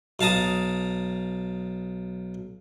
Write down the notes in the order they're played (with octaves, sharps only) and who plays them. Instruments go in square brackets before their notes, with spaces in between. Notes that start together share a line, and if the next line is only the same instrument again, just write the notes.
[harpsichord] B1 F5 A5 A#5 D#6